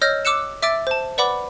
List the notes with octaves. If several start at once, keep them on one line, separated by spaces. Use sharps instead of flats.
C#5 D#5 E6 F6 G6 A#6
D6 E6 F#6 C#7 E7
E5 D6 E6 A6 D7
C5 A5
B4 D5 F#5 B5 D6